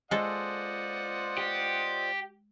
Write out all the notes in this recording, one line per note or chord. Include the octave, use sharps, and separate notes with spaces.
G#3 F4 A4 C5 D5 D#5 F#5
G4